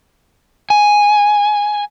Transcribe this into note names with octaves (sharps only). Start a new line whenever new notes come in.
G#5